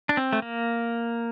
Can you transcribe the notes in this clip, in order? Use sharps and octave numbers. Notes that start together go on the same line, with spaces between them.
D4
C4
A3
A#3